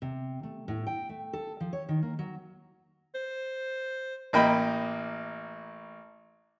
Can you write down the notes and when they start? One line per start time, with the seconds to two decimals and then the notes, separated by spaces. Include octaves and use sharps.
0.02 C3
0.43 A3
0.68 A2
0.87 G5
1.09 A3
1.33 A4
1.60 F3
1.73 C#5
1.89 D#3
2.02 A#3
2.19 F#3
3.15 C5
4.33 A1 A#3 D#5 G5 B5